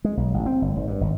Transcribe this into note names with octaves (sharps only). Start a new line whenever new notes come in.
G#3
B1
A1
C4
G1
G#1
G2
G#1